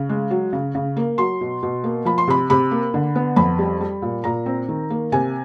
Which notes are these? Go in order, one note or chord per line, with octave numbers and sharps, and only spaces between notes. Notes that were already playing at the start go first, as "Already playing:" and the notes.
Already playing: C#3
G#3
F#3
C#3
C#3
A#3
F#3 C6
B2
B2
A#3
F3 B5
C6
C3 B5
C3 B5
A#3
D3
B3
F2 B5
G3
G3
A#2
A#2 A#5
C4
D#3
A#3
C3 G#5